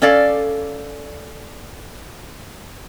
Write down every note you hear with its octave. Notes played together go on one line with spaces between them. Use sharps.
C#4 A4 D5 F5